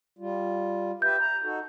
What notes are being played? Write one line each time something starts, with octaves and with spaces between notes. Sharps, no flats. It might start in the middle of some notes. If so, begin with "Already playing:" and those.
G3 F4
G4 B4 E5 G6
A#5
D#4 F#4 A4